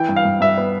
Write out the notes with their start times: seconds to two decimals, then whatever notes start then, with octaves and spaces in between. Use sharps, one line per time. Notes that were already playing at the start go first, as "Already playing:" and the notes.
Already playing: E3 G5
0.09 G2
0.16 F5
0.25 G2
0.41 G2 E5
0.58 B3